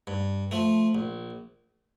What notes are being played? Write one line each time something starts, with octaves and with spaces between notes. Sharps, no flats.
G2
F3 A3
A#1